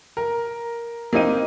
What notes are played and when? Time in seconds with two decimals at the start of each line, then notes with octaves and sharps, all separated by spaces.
0.17 A#4
1.13 A#3 C4 D#4 D#7